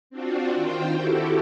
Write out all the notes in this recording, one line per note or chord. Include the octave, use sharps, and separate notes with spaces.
C4 D4 F4 F#4
D#3 F4 C5 G5
E4 F#4 G4 A4